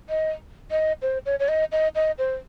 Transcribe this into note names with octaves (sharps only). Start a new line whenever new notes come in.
D#5
D#5
C5
C#5
C#5
D#5
D#5
D#5
C5